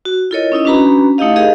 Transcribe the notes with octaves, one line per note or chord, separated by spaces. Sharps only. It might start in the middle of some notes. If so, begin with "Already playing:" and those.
F#4
E4 F4 A4 A#4 C#5 D#5
C#4 D#4 E4 D#5
C#4 D4 F#4 B4 A#5 B5
A3 D#4 E4 G4 D#5 F5
G4 G#4 A#4 D#5 F5